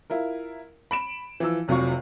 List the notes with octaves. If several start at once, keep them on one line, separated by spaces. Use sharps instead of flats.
E4 F4 A#4
B5 D7 E7
E3 F3 E6
F1 C3 F#3 F4 F5 C#6